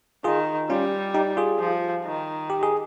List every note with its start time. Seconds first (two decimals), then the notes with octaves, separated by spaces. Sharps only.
0.24 D#3 F4 G#4
0.70 G3 C#4 F4
1.14 D#4 G4
1.37 F4 G#4
1.59 F3
2.04 D#3
2.50 G4
2.63 G#4